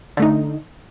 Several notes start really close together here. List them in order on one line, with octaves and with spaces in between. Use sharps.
D3 A3 D#4